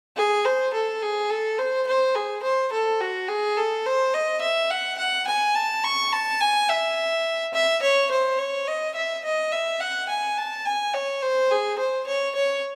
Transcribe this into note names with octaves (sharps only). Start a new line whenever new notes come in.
G#4
C5
A4
G#4
A4
C5
C5
G#4
C5
A4
F#4
G#4
A4
C5
D#5
E5
F#5
F#5
G#5
A5
C#6
A5
G#5
E5
E5
C#5
C5
C#5
D#5
E5
D#5
E5
F#5
G#5
A5
G#5
C#5
C5
G#4
C5
C#5
C#5